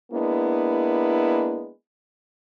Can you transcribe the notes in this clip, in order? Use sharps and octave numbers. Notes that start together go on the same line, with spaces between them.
G#3 A#3 B3 D4 E4